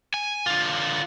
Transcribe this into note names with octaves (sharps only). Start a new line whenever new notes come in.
G#5
D3 F4